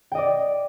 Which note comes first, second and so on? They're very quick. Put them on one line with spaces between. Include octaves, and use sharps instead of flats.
G5 D#5 D5